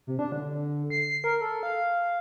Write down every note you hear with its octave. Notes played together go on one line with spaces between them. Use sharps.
C3
D4
D3
C7
A#4
A4
F5